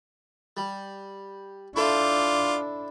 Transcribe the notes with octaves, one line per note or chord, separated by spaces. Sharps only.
G3
D4 E4 F4 A4 C5 D6